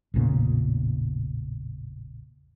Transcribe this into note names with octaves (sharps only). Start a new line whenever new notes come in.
A1 E2 A#2 C#3